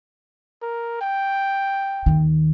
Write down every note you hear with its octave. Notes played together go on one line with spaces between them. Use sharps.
A#4
G5
D#2 D#3